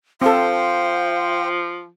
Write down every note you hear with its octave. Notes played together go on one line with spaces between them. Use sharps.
F3 C4 A4 C5 F5 G5